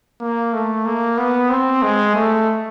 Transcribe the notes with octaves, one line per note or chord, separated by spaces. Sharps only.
A#3
A3
A#3
B3
C4
G#3
A3